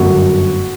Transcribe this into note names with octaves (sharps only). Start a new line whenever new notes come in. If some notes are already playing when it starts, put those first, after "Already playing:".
Already playing: G1 F#2 D3 A3 F#4